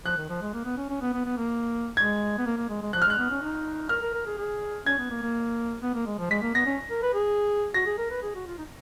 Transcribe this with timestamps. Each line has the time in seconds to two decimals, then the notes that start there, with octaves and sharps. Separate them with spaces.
0.05 F3 F#6
0.17 D#3
0.29 F3
0.42 G#3
0.54 A#3
0.65 B3
0.77 C#4
0.90 C#4
1.01 B3
1.14 B3
1.26 B3
1.37 A#3
1.97 G#3 G#6
2.38 B3
2.46 A#3
2.57 A#3
2.70 G#3
2.82 G#3
2.93 F3 F#6
3.02 F6
3.06 G#3 F#6
3.18 B3
3.30 C#4
3.42 D#4
3.89 A#4 F6
4.02 A#4
4.14 A#4
4.26 G#4
4.38 G#4
4.86 C#4 G#6
4.98 B3
5.10 A#3
5.22 A#3
5.82 B3
5.94 A#3
6.06 G#3
6.19 F3
6.31 G#3 B6
6.42 A#3
6.54 B3 A#6
6.66 C#4
6.90 A#4
7.03 B4
7.14 G#4
7.74 F#4 A#6
7.87 G#4
7.98 A#4
8.11 B4
8.22 G#4
8.35 F#4
8.47 F4
8.58 D#4